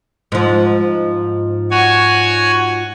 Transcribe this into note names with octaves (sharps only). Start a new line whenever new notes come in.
G#2 F3
F#4 C#5 G#5